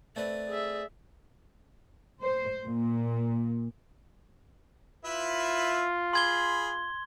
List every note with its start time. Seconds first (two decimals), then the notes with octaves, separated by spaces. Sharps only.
0.16 A3 C4 B4 D5
0.48 G#4 E5
2.22 C5
2.66 A#2
5.05 E4 F4 B4 E5
6.13 G#4 B5 C6 G#6 G7